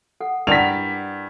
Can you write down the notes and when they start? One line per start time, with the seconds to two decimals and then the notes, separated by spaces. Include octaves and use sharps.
0.21 A4 F#5
0.47 G2 E4 A#4 D5 F#5 B6 F7